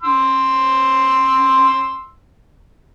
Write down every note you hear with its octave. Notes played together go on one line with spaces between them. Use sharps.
C6 E6